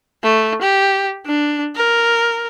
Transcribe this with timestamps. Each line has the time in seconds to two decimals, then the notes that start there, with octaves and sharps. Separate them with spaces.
0.23 A3
0.62 G4
1.26 D4
1.76 A#4